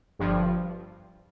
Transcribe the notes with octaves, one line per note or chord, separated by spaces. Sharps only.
G1 G2 F3